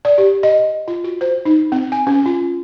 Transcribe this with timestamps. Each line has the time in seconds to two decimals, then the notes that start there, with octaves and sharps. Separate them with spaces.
0.05 D5
0.18 G4
0.43 D#5
0.88 F4
1.04 F#4
1.21 C5
1.45 D#4
1.72 C4
1.92 G#5
2.07 C#4
2.26 F4